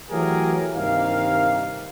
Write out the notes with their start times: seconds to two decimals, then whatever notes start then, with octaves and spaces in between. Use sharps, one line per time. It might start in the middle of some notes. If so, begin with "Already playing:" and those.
0.11 E3 F#3 A3 G4 G#4 A#4
0.75 G2 C3 D#3 A#3 F5